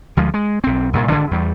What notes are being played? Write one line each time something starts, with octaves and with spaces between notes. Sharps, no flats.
D2 F3 G#3
G#3
B1 C4
C2 G2 A#2
G#1 D3 D4
E2 G3